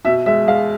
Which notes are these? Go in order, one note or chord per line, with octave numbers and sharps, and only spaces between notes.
B2 E5
G#3 E5
G#3 F5